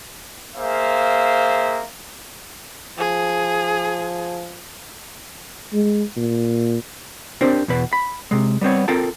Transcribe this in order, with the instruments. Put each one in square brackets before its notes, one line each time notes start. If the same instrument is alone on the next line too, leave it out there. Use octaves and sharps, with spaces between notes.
[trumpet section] A#3 G#4 C5 E5 F5
[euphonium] F3 [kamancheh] G#4
[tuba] G#3
A#2
[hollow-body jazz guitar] C4 D4 G4 A#4 C5
E2 B2 B4
B5
C3 G#3
G3 B3 C4 C#5
C4 F4 A4 A#4 G5 A5